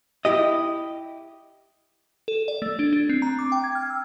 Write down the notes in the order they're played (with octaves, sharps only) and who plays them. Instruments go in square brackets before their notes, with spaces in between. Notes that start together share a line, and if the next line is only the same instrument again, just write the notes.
[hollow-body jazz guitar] E4 G4 D#5
[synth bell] A4
D5
A3
D4
D4
C4
A#5
D6
G5
G#6
F6
E6